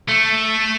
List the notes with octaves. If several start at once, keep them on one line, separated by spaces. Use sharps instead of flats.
A3